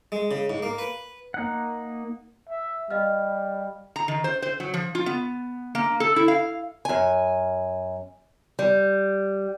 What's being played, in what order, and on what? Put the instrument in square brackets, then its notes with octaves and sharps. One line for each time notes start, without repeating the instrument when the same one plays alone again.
[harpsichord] G#3
C#3
G#2
A#3
B4
[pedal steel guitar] A#3 D#4 F#5
[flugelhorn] E5
[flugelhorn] G3 [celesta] D#5 F5 F6
[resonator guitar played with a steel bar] A#5
D#3
C5
C5
F#3
F3
F4
B3
A#3
A4
E4
F5
[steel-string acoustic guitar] F#2 G#5
G3